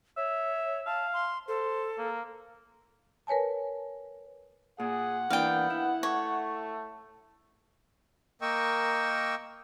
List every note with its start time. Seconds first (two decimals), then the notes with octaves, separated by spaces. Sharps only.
0.17 C#5 E5
0.86 F5 A5
1.13 C6
1.48 A4 C5
1.98 A#3
3.27 A#4 B4 C#5 G#5 A5
4.80 A#2 G#4 F#5
5.30 E3 A#3 B3 D4 F5 G5
5.70 E4
6.03 A3 C#5
8.42 A#3 A#4 D#5 G5 C#6 E6